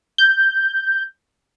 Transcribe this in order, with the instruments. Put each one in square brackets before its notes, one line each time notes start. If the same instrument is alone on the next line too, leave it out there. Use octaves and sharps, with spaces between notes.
[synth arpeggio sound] G6